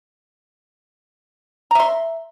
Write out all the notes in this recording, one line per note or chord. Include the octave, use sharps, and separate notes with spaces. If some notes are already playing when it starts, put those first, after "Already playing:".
E5 A#5 C6